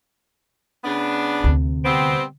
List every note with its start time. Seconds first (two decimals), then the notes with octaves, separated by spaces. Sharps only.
0.84 C#3 B3 D4
1.44 D2 C3
1.85 G3 B3 C4